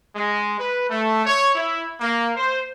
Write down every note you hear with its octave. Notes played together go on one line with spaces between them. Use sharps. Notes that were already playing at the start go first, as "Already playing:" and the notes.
G#3
B4
A3
C#5
E4
A#3
C5